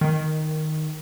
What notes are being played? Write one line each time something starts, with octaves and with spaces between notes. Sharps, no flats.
D#3